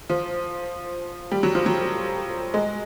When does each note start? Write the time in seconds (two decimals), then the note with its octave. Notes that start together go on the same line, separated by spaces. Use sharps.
0.10 F3
1.32 G3
1.43 F#3
1.55 F3
1.66 F#3
2.54 G#3